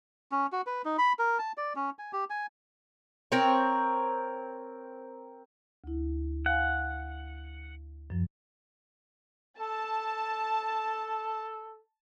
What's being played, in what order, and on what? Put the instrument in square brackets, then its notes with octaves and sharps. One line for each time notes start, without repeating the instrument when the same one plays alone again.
[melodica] C#4
F#4
B4
D#4
B5
A#4
A5
D5
C#4
G#5
G4
G#5
[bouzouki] C4 A#4 C#5
[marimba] D2 E4
[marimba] F5 G#5 [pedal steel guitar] F#5
[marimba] F#2 F3
[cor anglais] A4 [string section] A5